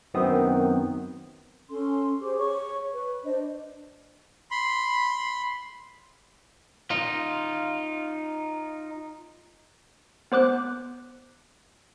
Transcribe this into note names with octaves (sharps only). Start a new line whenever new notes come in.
F#2 D#3 B3 C4 D#6
C#4 A4 C6
G4 G#4 C5 D6
C#5 C#6
B4
D4 C5 D#5
B5 C6
D#4 F4
B3 C5 D6 F#6